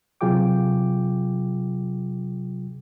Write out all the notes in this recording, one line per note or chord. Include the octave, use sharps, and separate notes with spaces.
C3 F#3 F4 G#4 G5 D6